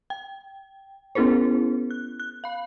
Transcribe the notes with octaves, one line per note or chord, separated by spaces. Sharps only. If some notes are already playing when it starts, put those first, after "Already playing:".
G5
B3 C#4 E4 G#4 A#4 C5
F#6
F#6
F5 B5